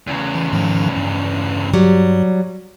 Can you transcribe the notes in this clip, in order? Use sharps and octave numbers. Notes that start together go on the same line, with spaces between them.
E2 C#3
E3
G#2 D#3 F3
G2
F#3 G3